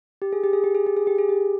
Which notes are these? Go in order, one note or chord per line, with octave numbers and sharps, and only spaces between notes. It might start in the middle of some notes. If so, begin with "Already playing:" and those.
G4
G#4
G4
G#4
G4
G#4
G4
G#4
G4
G#4
G4